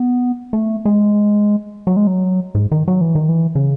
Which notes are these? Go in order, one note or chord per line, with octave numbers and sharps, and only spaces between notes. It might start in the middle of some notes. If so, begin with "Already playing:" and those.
Already playing: B3
A3
G#3
F#3
G#3
F#3
G#2
D#3
F#3
E3
D#3
E3
C#3